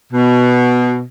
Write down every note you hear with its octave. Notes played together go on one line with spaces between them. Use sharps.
B2